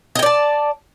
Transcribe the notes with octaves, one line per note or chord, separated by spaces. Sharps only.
D5 D#5 G5 A5